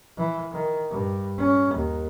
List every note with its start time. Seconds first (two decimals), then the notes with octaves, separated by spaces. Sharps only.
0.17 E3
0.52 D#3
0.90 G2
1.38 C#4
1.74 D#2